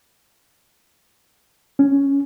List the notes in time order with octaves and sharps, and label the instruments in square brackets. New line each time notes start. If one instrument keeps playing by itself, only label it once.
[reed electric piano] C#4